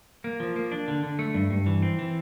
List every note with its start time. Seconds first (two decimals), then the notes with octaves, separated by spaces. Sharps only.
0.24 A#3
0.40 F3
0.56 A#3
0.72 D4
0.88 D3
1.03 D3
1.19 A3
1.35 G2
1.51 G2
1.66 E3
1.83 C4
1.99 E3